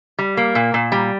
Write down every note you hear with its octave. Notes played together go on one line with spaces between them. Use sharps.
G3
A#3
A#2
A#2
G3